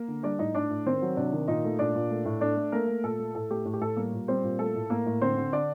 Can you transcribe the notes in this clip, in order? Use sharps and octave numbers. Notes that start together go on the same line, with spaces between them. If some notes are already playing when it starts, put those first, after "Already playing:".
Already playing: A#3 A#4
D3
G3 D4 D5
A2 D#4 D#5
A2 D4 D5
A2
D#3 C4 C5
F#3
C3 D4 D5
D#3
A#2 D#4 D#5
A3
A#2 D4 D5
A#2
A3
A2
A3 D4 D5
A3
A3 A#3 A#4
A3
A#2 A4
A3
A2 A4
A3 G4
A2
G4
A2 A4
G3 A#3 A#4
A#2
G3 C4 C5
A#2
A3 A4
A2
A2 A#3 A#4
A2
D3 C4 C5
D3
D3 D4 D5